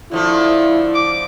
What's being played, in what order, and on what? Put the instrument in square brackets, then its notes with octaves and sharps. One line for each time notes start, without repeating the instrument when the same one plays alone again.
[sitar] D3 F3 A3 [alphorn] E4
[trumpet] D6